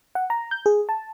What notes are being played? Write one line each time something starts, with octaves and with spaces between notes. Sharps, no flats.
F#5
A#5
G6
G#4
A5